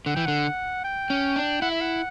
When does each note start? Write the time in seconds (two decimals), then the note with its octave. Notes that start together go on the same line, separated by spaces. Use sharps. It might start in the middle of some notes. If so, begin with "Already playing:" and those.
0.06 D3 F#5
0.16 E3 G5
0.26 D3 F#5
0.84 G5
1.10 C#4
1.36 D4
1.62 E4 F#5
1.71 E5
1.81 F#5